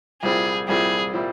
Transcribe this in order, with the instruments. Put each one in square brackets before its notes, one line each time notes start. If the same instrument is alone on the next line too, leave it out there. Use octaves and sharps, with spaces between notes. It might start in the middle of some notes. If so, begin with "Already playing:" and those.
[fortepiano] C2 A#2 G3 C4 E4 [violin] G#4
[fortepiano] C2 A#2 G3 C4 E4 [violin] G#4
[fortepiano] A#2 G3 C4 E4